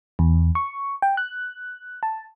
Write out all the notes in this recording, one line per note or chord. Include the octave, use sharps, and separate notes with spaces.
E2
C#6
G5
F#6
A5